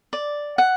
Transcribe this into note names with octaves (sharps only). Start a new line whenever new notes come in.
D5
F#5